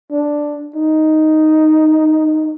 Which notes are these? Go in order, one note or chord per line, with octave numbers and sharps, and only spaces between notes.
D4
D#4